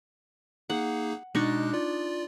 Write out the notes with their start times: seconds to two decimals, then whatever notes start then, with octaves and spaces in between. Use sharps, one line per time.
0.70 A#3 D#4 G#4 F#5
1.35 B2 G#3 D4 D#4 C#6 F#6
1.73 F4 D5